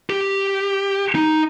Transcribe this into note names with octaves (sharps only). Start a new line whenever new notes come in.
G4
D#4